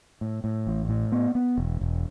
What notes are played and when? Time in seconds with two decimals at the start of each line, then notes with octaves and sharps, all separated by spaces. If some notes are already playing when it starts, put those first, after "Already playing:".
0.21 A2
0.44 A2
0.67 A1
0.89 A2
1.12 B3
1.35 B3
1.58 E1
1.81 E1